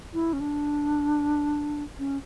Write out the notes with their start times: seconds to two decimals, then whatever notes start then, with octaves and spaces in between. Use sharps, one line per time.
0.14 E4
0.33 C#4
0.40 D4
1.99 C#4